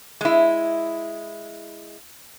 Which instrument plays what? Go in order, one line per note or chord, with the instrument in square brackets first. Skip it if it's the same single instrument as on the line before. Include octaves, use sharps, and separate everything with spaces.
[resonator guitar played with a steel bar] G#3 E4